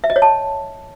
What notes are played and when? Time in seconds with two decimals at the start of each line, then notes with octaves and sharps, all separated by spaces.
0.04 E5
0.10 D#5
0.16 C#5
0.22 A5